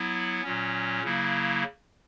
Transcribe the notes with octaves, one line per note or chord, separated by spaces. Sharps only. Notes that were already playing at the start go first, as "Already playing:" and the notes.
Already playing: F#3 B3 E4
A#2 F#3 C#4
C#3 F#3 A#3 E4